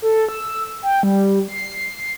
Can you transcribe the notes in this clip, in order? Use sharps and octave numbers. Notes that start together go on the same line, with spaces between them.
A4
E6
G5
G3
C7